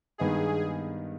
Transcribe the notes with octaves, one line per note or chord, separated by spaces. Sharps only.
G2 D#3 G#3 B3 D#4 G#4